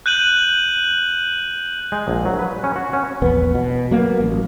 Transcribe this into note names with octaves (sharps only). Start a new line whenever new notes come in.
F#6 G6 D#7 F#7
G#3
A#1
F#3
B4
C#4
F#4
C#4
A#1 E2 B3
B2
F#3 A#3 B3
A1